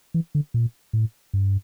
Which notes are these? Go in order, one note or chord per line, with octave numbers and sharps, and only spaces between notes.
E3
D3
A#2
A2
G2